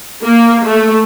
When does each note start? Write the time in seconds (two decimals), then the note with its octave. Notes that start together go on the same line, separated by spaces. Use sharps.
0.24 A#3
0.65 A3